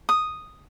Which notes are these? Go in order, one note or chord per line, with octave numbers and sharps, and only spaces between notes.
D#6